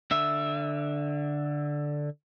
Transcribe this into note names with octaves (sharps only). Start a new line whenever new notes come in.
D3 E5